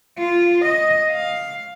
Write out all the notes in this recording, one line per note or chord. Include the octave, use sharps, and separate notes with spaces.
F4
D#5
F5